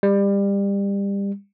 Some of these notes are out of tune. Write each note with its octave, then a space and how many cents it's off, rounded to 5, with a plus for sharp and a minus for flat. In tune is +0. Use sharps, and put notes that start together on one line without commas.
G3 +25